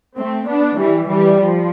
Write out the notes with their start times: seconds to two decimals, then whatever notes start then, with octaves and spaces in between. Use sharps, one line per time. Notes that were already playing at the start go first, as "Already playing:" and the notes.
0.18 A3 C4
0.49 B3 D4
0.79 E3 G3
1.10 E3 G3
1.42 F3